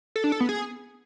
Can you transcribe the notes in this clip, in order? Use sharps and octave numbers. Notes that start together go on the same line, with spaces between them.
A4
D4
A4
B3
G#4